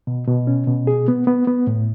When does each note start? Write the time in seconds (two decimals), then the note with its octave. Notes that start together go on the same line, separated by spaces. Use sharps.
0.07 B2
0.27 B2
0.47 C#4
0.67 B2
0.87 G#4
1.08 B3
1.27 B3
1.48 B3
1.67 A2